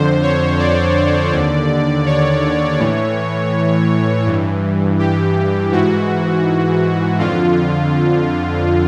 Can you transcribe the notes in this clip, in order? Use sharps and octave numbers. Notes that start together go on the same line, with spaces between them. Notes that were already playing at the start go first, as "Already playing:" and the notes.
Already playing: F2 D3 C5
C#5
D5
D#2 D3
C#5
A2 E3
G2 E3
G4
G#2 E3 F#4
F2 D3 F4